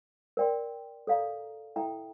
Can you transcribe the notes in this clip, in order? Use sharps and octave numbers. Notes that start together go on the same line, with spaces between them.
A#4 D5 G5 C6
A4 D5 F5 A#5
E4 A4 E5 G5 A#5